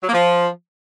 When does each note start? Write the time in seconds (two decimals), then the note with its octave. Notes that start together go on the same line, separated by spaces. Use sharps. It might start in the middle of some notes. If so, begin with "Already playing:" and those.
0.03 F#3
0.08 A#3
0.13 F3